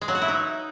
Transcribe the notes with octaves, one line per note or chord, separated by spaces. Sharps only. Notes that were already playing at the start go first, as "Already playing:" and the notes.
G#3
F#3
F#4
E4
D#4